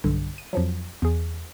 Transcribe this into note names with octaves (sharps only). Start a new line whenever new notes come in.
B1 G2 D3
D#7
F2 F3 F#3
E2 G#4